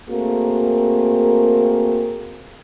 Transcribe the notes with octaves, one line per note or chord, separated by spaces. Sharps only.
A3 A#3 C4 F#4 G#4 A#4